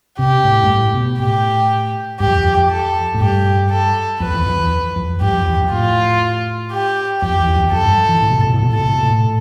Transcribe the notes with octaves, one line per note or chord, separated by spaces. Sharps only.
C3 G4
A2
G2
A2
B2
A2 G4
G2 G4
F2
E2
F2
A4
A2
G2 G4
A4
F2 B4
E2
F2
E2
F2
G2 G4
F2
E2
F2
A2 F4
G4
F2 G4
E2
F2
E2
F2 A4
G2
E3
A2
B2
A2
B2
A2
B2
A2 A4
B2
A2
B2
A2